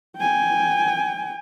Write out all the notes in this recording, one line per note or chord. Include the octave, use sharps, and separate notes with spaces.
G5 G#5